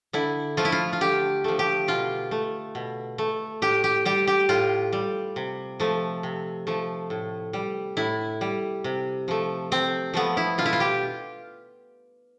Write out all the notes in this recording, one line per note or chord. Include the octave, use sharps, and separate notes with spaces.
D3 E4
F3 A3 F4
E4
F4
F4
D3 G4
F3 A3
G4
B2 F4
A3
B2
A3
A2 G4
G4
G3 G4
G4
A2 F4
G3
C3
F3 A3
C3
F3 A3
A2
G3
A2 E4
G3
C3
F3 A3
C3 C4
F3 A3 B3
E4
B2 F4
E4
F4
G4